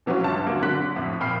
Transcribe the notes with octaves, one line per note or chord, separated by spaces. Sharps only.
B2 E3 F#3 B3 C#4 F4
G1 C#2 A5
D2 F#3 A#3
D3 F#3 F#6 B6
F2 A2
F2 A#2 G5 B5 F6 C7